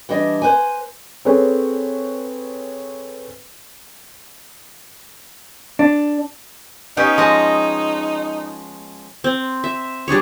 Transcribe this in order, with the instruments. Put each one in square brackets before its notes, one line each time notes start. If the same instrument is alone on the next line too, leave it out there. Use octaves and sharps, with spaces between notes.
[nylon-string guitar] E3 G3 D4 D#5
B4 C5 G#5
[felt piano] C4 G#4 A4 B4 C#5
[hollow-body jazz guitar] D4
[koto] B3 C#4 G4 [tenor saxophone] D#4
[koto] F3 G#3 D#5
[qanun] C4
E5
G3 D4 G#4 C#5